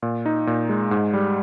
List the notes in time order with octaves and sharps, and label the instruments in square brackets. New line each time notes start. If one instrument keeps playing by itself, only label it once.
[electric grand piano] A#2
D#4
A#2
G#3
G#2
G3